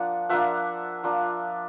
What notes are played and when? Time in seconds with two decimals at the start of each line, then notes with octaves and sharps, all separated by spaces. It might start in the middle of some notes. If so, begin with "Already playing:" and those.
Already playing: F3 A#3 D4 F#5
0.29 F3 A#3 D4 E5 F#5
1.04 F3 A#3 D4